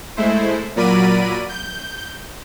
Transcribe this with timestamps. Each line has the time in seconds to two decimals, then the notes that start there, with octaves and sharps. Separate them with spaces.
0.17 G#3 A3 E4 C5
0.76 A#2 F#3 A#4 D5 B5 D#7
1.49 G6